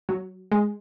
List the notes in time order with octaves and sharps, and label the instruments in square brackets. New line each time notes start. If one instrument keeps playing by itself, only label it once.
[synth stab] F#3
G#3